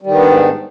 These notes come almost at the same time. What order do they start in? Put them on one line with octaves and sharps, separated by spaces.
G3 D#3 B3 D4 G#2